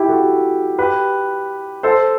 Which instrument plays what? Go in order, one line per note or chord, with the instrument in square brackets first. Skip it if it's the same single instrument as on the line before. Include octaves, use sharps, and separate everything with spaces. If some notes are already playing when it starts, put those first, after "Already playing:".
Already playing: [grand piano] E4 G4
F#4 A4
G4 B4
A4 C5